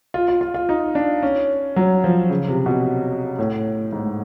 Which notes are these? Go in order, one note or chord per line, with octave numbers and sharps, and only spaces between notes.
F4
F4
F4
F4
D#4
D4
C#4
F#3
F3
C#3
C3
B2
A2
G#2